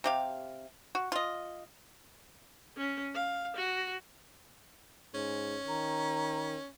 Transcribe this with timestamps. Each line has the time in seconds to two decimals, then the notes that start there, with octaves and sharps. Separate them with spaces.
0.04 C3 G4 F5
0.95 F#4
1.12 F4 D#5
2.77 C#4
3.15 F5
3.57 F#4
5.14 G#2 C#4
5.67 D#3 A#5